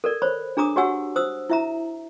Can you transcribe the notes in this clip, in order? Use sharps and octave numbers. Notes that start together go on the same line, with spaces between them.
A4 A#4 D5
C5 C#5 B5
D4 G#4 A#5 D6 D#6
F#4 G4 C#5 F#5 G#5 E6
C5 D#6 E6
E4 E5 A#5